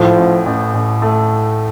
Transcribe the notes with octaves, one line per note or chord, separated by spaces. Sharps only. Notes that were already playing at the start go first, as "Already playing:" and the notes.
Already playing: A2 F3
A1
A1
A1
A3